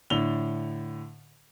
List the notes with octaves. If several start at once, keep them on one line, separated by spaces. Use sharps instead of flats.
A2 D3 F7 G7